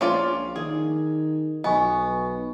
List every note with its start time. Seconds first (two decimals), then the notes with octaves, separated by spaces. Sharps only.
0.01 A#1 C#4 F4 D5
0.56 D#3 G#4
1.64 B1 B3 D#5 G#5 C#6